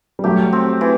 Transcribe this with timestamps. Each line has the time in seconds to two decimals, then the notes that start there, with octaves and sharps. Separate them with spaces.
0.19 G3
0.24 F#3 A3 G4
0.53 C4
0.81 E3